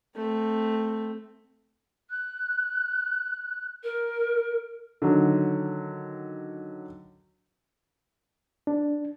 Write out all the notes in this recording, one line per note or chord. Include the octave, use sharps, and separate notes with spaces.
A3 C4
F#6
A#4
D3 D#3 F#3
D4